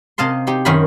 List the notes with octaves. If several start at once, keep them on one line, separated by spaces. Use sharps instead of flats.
C3 D#5 F5 A5 C6
C4 D#4 G4
F#2 D#3 C#4 A#4 C5 B5